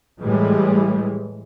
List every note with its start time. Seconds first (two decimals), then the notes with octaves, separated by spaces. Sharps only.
0.21 A2 E3 G3 G#3